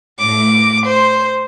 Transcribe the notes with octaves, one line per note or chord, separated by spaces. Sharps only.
A2 D6
C5